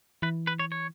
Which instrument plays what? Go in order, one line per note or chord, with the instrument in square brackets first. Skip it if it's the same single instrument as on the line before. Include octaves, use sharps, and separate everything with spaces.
[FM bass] E3 [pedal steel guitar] B4
[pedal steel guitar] B4
C#5
C#5